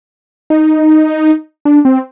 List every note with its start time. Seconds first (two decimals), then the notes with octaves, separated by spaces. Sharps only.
0.50 D#4
1.65 D4
1.85 C4